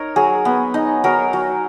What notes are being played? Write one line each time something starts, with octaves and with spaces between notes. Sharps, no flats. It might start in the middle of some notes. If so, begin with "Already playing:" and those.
Already playing: D#4 A#4 C#5
F#3 G#4
B3
D#4
F#3 A#4
F#3